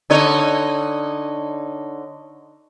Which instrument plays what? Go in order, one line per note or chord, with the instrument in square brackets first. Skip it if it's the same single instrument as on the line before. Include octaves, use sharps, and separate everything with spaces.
[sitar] D3 D#4 C#5